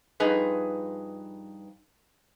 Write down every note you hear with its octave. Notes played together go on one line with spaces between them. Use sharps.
G2 F3 D#4 G#4 B4